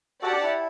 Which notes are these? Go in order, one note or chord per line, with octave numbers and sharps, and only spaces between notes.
F#4 G4 A4 D5 F#5 A5
D4
E4